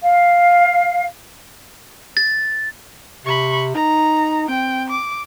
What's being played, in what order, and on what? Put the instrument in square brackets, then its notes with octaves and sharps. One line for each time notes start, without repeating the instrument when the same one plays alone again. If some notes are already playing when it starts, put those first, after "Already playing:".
[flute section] F5
[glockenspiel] A6
[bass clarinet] C3 [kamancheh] B5 C#6
[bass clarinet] D#4 [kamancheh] A#5
[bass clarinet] C4 [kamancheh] G5
[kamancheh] D6